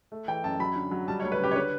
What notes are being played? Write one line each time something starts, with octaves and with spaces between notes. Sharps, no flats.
A3
E3 G5
F#2 A5
F#3 B5
D3
F#3
G3 A5
C#5
D2
B4
C#3 G4
C#5
D3 B4